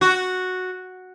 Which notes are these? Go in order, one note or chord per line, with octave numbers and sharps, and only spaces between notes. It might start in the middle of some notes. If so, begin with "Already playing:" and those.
F#4